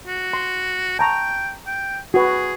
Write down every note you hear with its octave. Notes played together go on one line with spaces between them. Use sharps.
F#4
C6
G5 A5 A#5 C#6
G5
F#4 G#4 B4